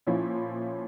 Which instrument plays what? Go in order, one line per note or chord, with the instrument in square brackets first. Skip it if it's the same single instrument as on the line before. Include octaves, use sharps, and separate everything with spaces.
[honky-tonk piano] A#2 F3 C#4 E4